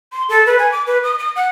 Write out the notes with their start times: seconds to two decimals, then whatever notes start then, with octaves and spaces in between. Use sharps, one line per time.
0.12 C6
0.29 A4
0.46 B4
0.59 G#5
0.72 D6
0.87 B4
1.04 D#6
1.19 D#6
1.36 F#5